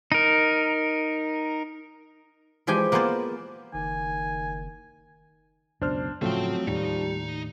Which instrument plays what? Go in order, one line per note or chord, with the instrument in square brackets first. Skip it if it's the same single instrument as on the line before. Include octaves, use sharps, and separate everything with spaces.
[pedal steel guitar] D#4 A#4
[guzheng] E3 F3 G#3 G4 G5 G#5
A#3 B3 F4 G#4 C5 D5
[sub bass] F#1 [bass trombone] D#3 [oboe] G#5
[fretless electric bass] C#2 F#2 B2 [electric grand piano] D4 C5 F6
[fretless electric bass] A2 C#3 [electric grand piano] F3 A3 [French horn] F#3 [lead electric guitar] C4 G5
[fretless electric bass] D#2 A2 [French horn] G3 [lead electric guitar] D#4